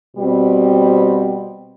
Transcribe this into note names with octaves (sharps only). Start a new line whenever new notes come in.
B2 G3 C4